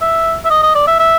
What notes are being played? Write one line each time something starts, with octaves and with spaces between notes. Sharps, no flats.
E5
E5
D#5
D#5
D5
E5
E5